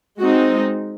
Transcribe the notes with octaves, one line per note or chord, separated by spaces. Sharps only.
G#3 C4 D#4 F#4